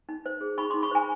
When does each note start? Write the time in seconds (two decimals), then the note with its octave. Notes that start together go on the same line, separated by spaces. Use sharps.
0.09 D#4
0.26 C5
0.41 G#4
0.58 D#4 B5 C#6
0.70 D#4 C6 D6
0.83 B5 C#6
0.91 C5 G#5 A#5